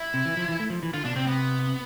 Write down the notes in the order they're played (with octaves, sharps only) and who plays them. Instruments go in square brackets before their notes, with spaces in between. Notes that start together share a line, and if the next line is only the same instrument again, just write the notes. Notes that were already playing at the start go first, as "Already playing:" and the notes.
Already playing: [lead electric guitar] E4
[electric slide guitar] C3
E3
F3
E3
A3
F3
E3
[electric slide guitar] D3 [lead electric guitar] F4
[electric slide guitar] B2 [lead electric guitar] D4
[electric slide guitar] C3 [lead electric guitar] C4
[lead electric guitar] B3